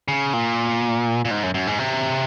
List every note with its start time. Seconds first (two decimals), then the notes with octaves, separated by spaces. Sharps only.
0.08 C#3
0.33 A#2
1.25 A#2
1.31 G#2
1.43 F#2
1.54 F#2
1.67 G#2
1.79 C3